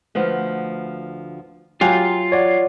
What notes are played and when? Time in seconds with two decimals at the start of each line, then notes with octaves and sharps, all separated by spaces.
0.15 D2 F3 B3
1.81 F#3 F4 G4 G#5
2.32 C#5 D5 F#5